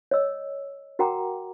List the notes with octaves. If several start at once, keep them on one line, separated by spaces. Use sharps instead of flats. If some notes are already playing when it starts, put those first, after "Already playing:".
C#5 D#5 E6
F#4 A#4 F#5 G5 A#5 D6